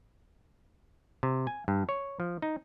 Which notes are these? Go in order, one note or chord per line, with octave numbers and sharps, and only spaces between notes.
C3
G#5
G2
C#5
F3
D#4